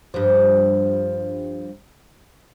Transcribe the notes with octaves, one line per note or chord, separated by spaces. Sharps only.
G2 F3